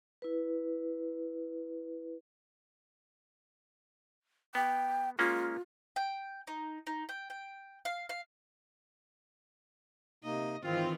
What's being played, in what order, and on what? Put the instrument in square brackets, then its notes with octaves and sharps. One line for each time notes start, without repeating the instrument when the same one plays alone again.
[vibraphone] E4 B4
[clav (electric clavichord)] B3 [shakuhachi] G5
[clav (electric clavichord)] G#3 A#3 C#4 [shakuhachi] F4
[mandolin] G5
D#4
D#4
G5
G5
F5
F5
[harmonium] C3 A#3 D#4 [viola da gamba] D#5
[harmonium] G#2 [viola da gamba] D#3 E3 [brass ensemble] C4 F4